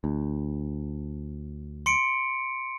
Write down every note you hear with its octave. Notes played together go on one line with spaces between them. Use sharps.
D2
C6 C#7 D7